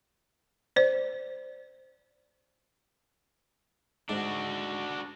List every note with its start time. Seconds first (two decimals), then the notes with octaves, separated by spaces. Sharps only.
0.76 C5 D5
4.09 G#2 D4 F#4